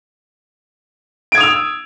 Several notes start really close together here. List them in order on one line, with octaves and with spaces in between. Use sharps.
D7 G#6 D#6 F7 E6